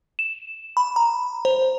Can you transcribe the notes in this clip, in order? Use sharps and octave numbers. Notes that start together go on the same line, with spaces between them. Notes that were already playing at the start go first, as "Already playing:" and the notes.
E7
B5
A#5
C5